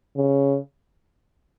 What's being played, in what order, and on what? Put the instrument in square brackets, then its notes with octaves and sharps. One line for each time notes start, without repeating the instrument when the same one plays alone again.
[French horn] C#3